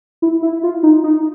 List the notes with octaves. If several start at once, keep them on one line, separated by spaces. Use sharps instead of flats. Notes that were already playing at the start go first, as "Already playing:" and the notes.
E4
E4
F4
D#4
D#4